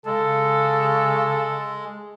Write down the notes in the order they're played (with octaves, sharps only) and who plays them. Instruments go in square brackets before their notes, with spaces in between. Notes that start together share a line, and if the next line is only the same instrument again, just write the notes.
[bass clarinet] C#3 [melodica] G#3 [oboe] A4